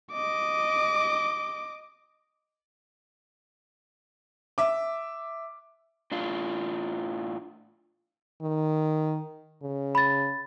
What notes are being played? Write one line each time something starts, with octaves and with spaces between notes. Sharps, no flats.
D#5 D6
E5 D6
A2 D4 F4
D#3
C#3
B5 A6